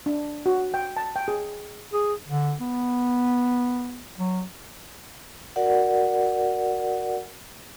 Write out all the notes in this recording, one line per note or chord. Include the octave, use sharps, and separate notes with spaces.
D4
F#4
G5
A5
G5
G#4
G#4
D3
B3
F#3
F#4 A#4 D5 F#5